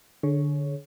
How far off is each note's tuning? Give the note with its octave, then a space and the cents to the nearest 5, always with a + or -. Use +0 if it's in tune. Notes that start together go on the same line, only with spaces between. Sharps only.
D3 +0 G#4 +30 C#5 +0